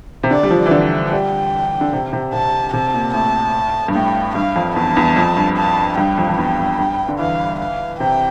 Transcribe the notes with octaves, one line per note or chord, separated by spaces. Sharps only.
C3
D3 D5
G3
F3
E3
D3
G3 G5
D3
C3
C3
C3 A5
C3 A5
A#2
A2 A5
G2
A2 G5
G2 F5
F2
E2 A5
E2
F2
G2
A5
G2 G5
F2
F2
E2 G5
G2
G2
D3
E3 F5
F5
C3 G5